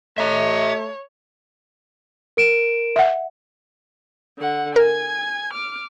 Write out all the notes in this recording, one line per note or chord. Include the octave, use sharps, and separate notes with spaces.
A3 C#5 D#5 E5 A#5
A#4 D7 E7
E5 F#5
D3 F#5
A#4 G#5 G#6
D6 F6